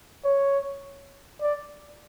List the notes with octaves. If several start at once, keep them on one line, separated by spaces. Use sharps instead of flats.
C#5
D5